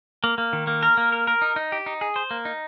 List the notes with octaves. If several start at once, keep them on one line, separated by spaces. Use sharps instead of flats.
A#3
A#3
D#3
A#3
A#4
A#3
A#4
A#4
D#4
D#4
G4
D#4
G#4
C5
A#3
D#4